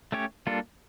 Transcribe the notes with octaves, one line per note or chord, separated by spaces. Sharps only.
A3 C#4 G4 C#5
G3 A#3 D4 F4 A4